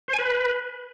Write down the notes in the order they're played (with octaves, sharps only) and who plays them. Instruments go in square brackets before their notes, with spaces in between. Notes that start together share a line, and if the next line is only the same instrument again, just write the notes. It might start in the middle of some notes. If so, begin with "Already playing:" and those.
[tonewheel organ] C5
G#5
B4